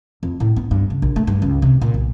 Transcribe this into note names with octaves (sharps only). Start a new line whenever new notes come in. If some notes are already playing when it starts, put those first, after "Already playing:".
F2
A2
B3
G2
C#3
A#1
A3
G2
C#2
C3
A#2
B1